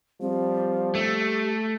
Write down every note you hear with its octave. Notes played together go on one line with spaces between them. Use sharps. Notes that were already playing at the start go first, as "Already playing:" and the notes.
F3 G3 C4
A3 G4